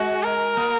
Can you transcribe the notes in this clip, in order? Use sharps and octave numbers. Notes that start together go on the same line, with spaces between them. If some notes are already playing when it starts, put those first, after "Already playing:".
Already playing: G#3 F#4
A#4
A#3